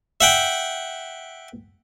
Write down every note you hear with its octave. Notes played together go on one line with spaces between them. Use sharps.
E5 F#5 G5